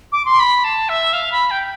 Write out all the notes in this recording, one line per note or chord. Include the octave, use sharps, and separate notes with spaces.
D6
C6
B5
A5
E5
F5
B5
G5